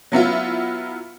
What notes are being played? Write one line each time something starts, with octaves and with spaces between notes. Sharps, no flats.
F#3 B3 E4 F4